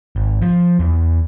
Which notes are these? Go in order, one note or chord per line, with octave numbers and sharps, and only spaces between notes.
G#1
F3
E2